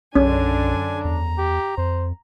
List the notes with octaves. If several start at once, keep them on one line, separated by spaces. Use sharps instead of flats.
B1 F#2 D3 C#4 D4 G#5
E2 A#5
G4
F2 C5